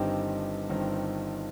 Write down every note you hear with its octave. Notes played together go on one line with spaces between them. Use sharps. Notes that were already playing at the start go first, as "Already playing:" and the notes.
Already playing: G1 G2 D#3 C4 D#4 G4
G1 G2 D#3 C4 D#4